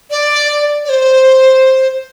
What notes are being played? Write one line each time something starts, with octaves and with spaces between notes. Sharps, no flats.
D5
D5
C5